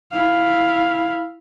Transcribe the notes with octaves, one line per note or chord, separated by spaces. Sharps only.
E4 F5